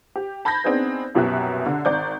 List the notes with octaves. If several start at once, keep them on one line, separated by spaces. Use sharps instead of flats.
G4
A5 B5 G6 G#6 A#6
B3 C4 D4 D#4 G#4 B4
C2 F#2 B2 G4 E5 F#6
D3
G#1 D5 G6